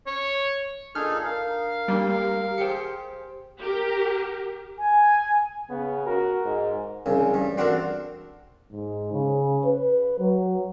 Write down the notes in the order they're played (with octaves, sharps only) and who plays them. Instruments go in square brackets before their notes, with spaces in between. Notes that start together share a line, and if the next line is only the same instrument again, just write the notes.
[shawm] C#5
[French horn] A#2 [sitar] D4 [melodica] D#4 G#4 A4 [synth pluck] F6
[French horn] A#4 [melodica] F5
[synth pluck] G3 A#3 [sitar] G#3 D4 G4
[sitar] G4 G#4 C5 [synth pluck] G5 C#7
[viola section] G4 A#4
[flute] G#5
[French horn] C#3 [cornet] B3
[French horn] F#4 [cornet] A#4
[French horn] G#2
[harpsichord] C2 C#3
G2
C4 D4 F#4 A4 A#4
[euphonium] G#2
C#3
B4
F#3